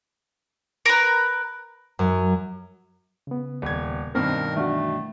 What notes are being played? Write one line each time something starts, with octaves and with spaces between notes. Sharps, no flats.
A#4 B4
F#2
C#3 B3
D#1 G#6
G2 B2 D#3 C4 A#4
E3 A3 D4 F#4